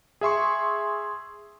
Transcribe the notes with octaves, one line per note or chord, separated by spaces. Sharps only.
G#4 E5 C6 C#6